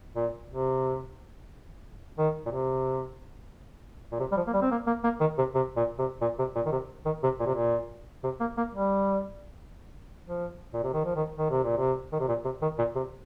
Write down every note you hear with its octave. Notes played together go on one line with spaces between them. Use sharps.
A#2
C3
D#3
A#2
C3
A#2
C3
G3
F3
A#3
G3
C4
A#3
A#3
A#3
D#3
C3
C3
A#2
C3
A#2
C3
A#2
D#3
C3
D#3
C3
A#2
C3
A#2
C3
A#3
A#3
G3
F3
A#2
C3
D#3
F3
D#3
D#3
C3
A#2
C3
D#3
C3
A#2
C3
D#3
A#2
C3